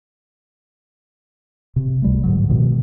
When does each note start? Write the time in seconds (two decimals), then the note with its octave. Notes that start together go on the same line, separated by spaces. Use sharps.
1.76 C3
2.02 C#2 G3 A3
2.24 G#2 D3 F#3
2.49 B2 D#3 F3 G#3